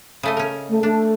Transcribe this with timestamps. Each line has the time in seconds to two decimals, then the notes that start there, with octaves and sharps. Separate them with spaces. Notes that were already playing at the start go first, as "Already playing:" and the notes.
0.23 C#3 A3 D#5
0.37 C#4 A#4
0.69 A3
0.83 A3 D4